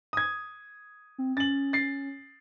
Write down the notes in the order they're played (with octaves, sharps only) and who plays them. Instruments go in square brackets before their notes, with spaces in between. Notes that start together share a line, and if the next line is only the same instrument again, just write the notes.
[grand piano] D#6 G#6
[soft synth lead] C4
[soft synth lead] C#4 [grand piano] A6 F#7
[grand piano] A6 C7